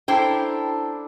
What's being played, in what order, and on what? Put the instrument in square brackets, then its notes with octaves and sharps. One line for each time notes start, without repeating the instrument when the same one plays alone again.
[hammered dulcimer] D4 A4 A#5 [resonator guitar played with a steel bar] E4 C5 G5